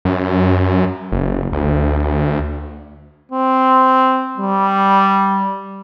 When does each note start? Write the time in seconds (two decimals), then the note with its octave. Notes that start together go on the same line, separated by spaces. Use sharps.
0.05 F#2
1.12 F#1
1.52 D2
3.32 C4
4.38 G3